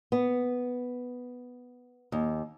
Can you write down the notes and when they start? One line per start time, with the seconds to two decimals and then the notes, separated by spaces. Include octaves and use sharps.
0.12 B3
2.12 D#2